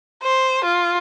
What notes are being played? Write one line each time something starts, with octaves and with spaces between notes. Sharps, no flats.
C5
F4